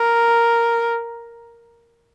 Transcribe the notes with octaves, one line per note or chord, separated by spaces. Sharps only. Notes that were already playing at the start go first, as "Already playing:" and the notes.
Already playing: A#4